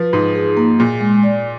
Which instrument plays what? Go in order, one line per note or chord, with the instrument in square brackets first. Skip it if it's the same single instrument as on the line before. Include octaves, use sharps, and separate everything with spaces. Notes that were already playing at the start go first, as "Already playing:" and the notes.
Already playing: [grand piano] F3 [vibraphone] B4
[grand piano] G#2 [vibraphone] D#4
[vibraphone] G#4
A#3
[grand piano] A#2 [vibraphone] G#4
[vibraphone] G#3
D5